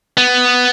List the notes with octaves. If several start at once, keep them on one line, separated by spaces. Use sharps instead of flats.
B3